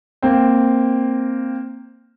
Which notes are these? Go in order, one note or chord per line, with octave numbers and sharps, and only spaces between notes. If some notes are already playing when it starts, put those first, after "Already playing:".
A#3 C4